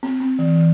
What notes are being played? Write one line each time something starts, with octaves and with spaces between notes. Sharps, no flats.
C4
C4
E3
E3